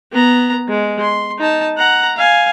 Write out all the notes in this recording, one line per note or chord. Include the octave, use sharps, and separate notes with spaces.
B3 A#5
G#3
C6
D#4 A5
F#5 A#5
F5 G#5